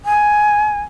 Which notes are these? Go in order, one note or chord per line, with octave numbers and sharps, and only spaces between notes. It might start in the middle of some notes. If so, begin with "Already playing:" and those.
G#5